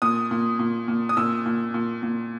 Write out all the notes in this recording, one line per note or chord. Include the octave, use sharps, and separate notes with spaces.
A#2 D#6
A#2
A#2
A#2
D#6
A#2 E6
A#2
A#2
A#2